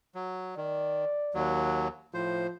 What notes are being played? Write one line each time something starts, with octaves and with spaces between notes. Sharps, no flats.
F#3
D#3 D5
D#2 F#3
A2 F3 C5